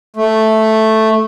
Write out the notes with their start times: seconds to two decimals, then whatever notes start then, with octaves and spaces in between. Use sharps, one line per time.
0.16 A3